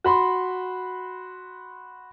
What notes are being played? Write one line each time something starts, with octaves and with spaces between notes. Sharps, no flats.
F#4 B5 C6